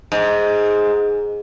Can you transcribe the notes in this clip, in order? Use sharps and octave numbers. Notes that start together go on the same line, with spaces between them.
G#2